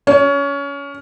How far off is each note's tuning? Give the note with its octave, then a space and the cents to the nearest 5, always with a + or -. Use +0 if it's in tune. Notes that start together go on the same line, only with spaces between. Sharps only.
C#4 +25